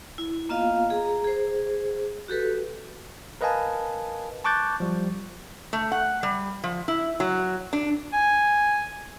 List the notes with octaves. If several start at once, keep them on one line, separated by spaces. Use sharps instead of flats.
E4
A#3 B3 F4 D#5 F5
G#4 A#5
G#4 C5
F#4 G4 A4 B4
A#4 B4 D#5 F5 G#5 A5
A5 C#6 D6 F#6 G6 A6
F3 G3
A3
F#5
G3
F3
E4
F#3
D4
G#5